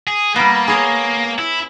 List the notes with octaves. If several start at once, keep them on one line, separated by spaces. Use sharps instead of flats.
G#4
G3 A#3 B3
G#4 C#5
E4